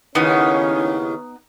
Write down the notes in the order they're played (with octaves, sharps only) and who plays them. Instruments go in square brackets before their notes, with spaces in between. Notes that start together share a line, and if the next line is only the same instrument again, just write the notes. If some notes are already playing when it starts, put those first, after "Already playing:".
[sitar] D#2 C#3 [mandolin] B3 D#4 [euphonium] C#4 [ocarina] E4